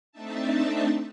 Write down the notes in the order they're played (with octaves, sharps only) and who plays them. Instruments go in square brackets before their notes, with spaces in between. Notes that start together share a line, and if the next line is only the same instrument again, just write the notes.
[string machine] A3 C4 D4 D#4 E5 A5